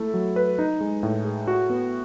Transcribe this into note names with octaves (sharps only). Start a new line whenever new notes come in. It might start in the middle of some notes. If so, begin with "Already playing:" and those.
Already playing: A3 E4 A4
F#3
B4
D#4
G#3
A2
G#4
F#4
B3